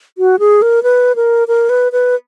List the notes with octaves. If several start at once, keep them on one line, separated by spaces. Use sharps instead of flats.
F#4
G#4
A#4
B4
A#4
A#4
B4
B4